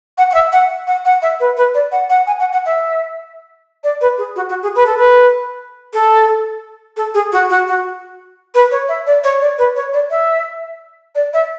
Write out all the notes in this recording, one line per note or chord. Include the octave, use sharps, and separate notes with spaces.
F#5
F#5
E5
F#5
F#5
F#5
E5
B4
B4
D5
F#5
F#5
G#5
F#5
F#5
E5
D5
B4
G#4
F#4
F#4
G#4
B4
A4
B4
A4
A4
G#4
F#4
F#4
F#4
B4
C#5
E5
D5
C#5
D5
B4
C#5
D5
E5
D5
E5